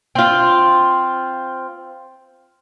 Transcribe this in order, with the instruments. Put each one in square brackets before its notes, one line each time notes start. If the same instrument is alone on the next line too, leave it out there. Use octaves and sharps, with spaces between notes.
[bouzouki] C4 F4